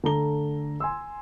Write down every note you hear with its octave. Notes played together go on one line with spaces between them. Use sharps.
D3 A3 A#5 G7
G#5 C6 E6